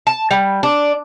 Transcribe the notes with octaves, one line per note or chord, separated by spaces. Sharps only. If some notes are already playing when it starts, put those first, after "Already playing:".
A5
G3
D4